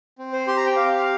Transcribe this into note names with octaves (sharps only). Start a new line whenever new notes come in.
C4
C5
G4 C6
A#5
G5
G4 F5